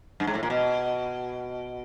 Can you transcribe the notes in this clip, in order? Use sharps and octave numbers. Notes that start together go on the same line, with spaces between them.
G2
G#2
A2
A#2
B2